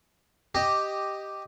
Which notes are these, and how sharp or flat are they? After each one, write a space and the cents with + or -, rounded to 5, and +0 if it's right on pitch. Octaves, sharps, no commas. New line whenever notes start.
G4 +0 D#5 +0